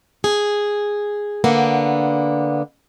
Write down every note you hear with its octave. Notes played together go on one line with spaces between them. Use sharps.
G#4
D3 A#3 B3